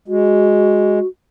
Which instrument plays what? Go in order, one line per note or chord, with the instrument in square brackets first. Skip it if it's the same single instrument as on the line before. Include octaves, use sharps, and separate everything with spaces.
[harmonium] G#3 [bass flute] F#4